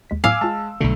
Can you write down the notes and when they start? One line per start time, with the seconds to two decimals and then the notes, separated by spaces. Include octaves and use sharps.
0.10 D#2 G#3 B6
0.24 A2 F#3 B3 F5 G#5 D6 E6
0.41 G#3 F4 G#5 A5 D6
0.80 B1 B2 D3 A3